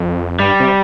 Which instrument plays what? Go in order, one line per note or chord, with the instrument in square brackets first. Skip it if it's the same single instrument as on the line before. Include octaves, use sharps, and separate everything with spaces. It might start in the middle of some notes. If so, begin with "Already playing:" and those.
Already playing: [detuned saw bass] F2
[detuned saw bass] G2 [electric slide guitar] G3
[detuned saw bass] C3